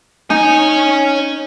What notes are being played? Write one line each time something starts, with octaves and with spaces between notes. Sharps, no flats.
D#4 C#5 G#5